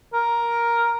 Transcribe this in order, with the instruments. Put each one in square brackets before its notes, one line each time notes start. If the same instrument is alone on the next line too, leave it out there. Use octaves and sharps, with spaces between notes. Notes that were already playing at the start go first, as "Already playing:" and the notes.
[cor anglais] A#4